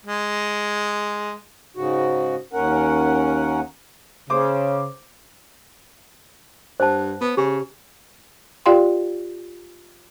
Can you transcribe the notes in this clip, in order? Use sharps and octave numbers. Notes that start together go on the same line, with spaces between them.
G#3
G#2 C#3 F#4
D#2 C#4 A#4 F#5
C#3 C5 D6
G2 C5 F#5 A5
B3
C#3 G4
F4 G4 D5 F5 G5 C6